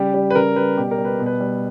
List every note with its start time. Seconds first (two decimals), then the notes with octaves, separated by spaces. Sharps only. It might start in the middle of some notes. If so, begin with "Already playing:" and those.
Already playing: C#3 G3 G4
0.14 G3
0.30 B4
0.35 C#3 A#4
0.56 G3 B4
0.77 B2 G4
0.91 A#4
0.98 G3
1.05 B4
1.19 B2
1.26 B4
1.40 G3